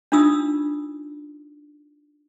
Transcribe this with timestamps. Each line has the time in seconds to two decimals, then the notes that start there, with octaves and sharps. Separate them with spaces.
0.12 D4 D#4 F4 D#6 E6